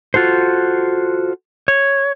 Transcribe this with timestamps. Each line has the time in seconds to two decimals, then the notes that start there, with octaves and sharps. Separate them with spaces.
0.14 F4 F#4 A4 C5
1.68 C#5